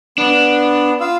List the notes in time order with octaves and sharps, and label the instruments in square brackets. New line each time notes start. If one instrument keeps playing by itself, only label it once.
[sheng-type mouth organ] B3 [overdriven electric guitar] D4
[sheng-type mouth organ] F4 F5 E6